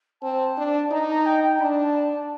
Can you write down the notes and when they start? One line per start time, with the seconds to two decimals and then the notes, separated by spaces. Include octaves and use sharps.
0.22 C4 A5
0.57 D4
0.91 D#4 A#5
1.09 A#5
1.26 G5
1.44 G5
1.60 D4 B5
1.64 A5